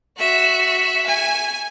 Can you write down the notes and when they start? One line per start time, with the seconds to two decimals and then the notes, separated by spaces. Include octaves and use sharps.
0.18 F#4 E5
1.06 G#5